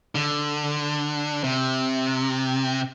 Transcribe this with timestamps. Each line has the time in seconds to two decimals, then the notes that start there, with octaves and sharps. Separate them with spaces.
0.15 D3
1.44 C3